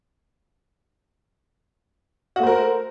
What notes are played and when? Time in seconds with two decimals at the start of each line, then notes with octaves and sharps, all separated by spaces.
2.36 F#4
2.40 A3
2.43 C5
2.47 A#4